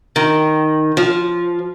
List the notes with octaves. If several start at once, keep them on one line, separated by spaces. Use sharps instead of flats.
D#3
F3